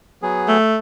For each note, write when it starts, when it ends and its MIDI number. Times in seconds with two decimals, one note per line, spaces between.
0.22 0.57 54
0.22 0.57 59
0.22 0.57 68
0.48 0.77 57